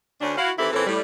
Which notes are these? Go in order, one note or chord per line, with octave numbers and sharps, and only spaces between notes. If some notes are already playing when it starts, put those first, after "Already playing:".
D2 C#4 D4
E4 F#4 F5
D#3 E3 C4 E4 G4 A4
A#2 E3 C4 C#4 A4
A2 G3